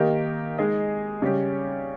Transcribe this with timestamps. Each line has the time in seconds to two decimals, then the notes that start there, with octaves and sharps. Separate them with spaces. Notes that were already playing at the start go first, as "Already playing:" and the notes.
Already playing: D#3 A#3 D#4 G4 A#4
0.58 G#3 D#4 G#4 D#5
1.22 C#3 G3 C#4 G4